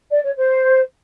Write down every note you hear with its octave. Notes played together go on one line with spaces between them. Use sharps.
D5
C#5
C5